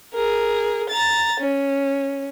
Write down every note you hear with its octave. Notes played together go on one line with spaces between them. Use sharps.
G#4 A#4
A#5 A6
C#4